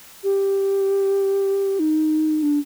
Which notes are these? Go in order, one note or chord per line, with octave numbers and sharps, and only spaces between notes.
G4
D#4
D4